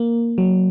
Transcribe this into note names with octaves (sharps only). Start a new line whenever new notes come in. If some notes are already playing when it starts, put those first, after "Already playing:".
Already playing: A#3
F#3